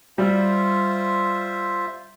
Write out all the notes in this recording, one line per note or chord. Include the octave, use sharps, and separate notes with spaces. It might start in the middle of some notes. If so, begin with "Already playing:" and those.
G3 F4 C5 E5